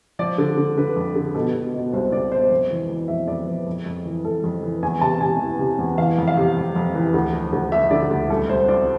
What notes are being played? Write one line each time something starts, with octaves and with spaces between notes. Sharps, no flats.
F3 D5
D3
D3
D3 B4
F2
D3
B2 A4
B2
B2
C2 C5
C2 D5
B2 C5
F2
E3
E3
F2 E5
F2 D5
F2 B4
F2
F2
E3
F2 A4
F2
E3
E2 G#5
C3 A5
C3 G#5
E3
C3
E2
E3 F5
F2
F5
C3
F2
F2
E3
D2
F3
D2
F3 E5
D3 D5
D2
C2 A4
C2 C5
C2 D5